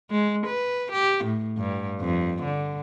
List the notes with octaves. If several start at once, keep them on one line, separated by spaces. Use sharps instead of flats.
G#3
B4
G4
A2
G2
F2
D3